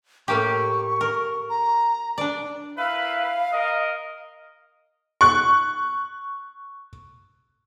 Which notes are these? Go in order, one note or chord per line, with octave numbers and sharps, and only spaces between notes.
A2 A#3 G4 C#6
A#4
A#5
D4 D5
E4 A#4 B4 F5
A#4 D#5
C#6 F#6